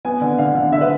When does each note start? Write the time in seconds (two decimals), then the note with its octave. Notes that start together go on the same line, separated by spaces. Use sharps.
0.05 B3 G#5
0.21 D3
0.38 D3 F5
0.55 D3
0.72 D3 E5
0.81 B4